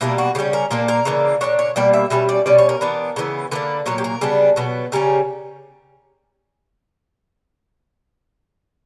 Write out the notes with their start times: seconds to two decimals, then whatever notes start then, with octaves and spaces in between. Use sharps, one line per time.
0.01 B2 G3 A#3 D4 E4
0.18 F#4
0.35 C#3 G3 C#4 G4
0.53 A#4
0.71 A#2 A#3 D4 A#4
0.88 A#4
1.05 C#3 E3 A#3 D4
1.41 A#2 A#3 D4 C#5
1.59 C#5
1.76 B2 G3 A#3 D5
1.93 E5
2.10 B2 G3 C#4 E5
2.29 D5
2.46 B2 G3 C#4 D5
2.58 C#5
2.69 A#4
2.81 E3 B3 D4
3.16 C#3 E3 B3
3.51 D3 A#3 D4 B4
3.86 A#2 F#3 A#3 C#5
3.98 G4
4.04 A#4
4.21 C#3 G3 B3 D4
4.56 B2 F#3 B3
4.92 C#3 G3 C#4 A#4